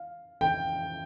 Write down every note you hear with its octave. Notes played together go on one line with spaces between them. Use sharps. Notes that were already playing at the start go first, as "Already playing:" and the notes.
Already playing: F5
G5